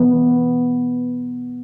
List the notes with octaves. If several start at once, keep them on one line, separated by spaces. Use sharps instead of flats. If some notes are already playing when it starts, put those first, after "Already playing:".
Already playing: E3 B3